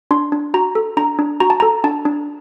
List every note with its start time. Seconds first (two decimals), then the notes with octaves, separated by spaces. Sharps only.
0.11 D4 C6
0.32 D4
0.54 F#4 A#5
0.75 A4
0.97 D4 A#5
1.19 D4
1.40 F#4 A#5
1.50 A5
1.60 A4 A#5
1.84 D4 A5
2.05 D4